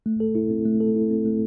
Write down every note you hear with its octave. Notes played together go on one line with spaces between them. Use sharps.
A3
A4
E4
C4
A3
A4
E4
C4
A3